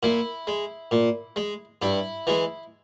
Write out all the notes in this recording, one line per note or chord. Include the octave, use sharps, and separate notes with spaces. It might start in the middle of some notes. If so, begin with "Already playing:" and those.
A#2 E4
G#3
A#2
G#3
G2 E4
E3 G#3